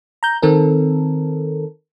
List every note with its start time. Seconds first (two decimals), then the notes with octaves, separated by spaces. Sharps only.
0.23 A#5 G6
0.42 D#3 C4 A4 A#4